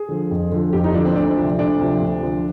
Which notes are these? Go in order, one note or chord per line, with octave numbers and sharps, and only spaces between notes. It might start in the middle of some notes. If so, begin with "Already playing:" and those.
Already playing: G#4
D3 F3
F2
D3 F3
F2 G4
D#4
D3 F3 D4
C4
D2 D4
C3 F3
D2 D4
C3 F3
D2
D3 F3